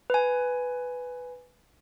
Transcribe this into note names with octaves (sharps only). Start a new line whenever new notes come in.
B4 G#5